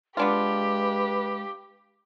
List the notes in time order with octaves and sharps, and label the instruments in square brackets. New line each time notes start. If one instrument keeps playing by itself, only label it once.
[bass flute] G#3 [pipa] B3 D4 F4 [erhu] G4 [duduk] B4